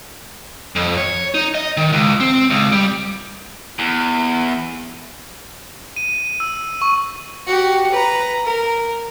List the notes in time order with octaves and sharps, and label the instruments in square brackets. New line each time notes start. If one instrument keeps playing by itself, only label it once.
[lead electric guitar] F2
C#5
D#4
D#5
D#3
C#2
C4
C#2
G3
E2
[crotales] D#7
E6
C#6
[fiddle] F#4 G4
B4 A#5
A#4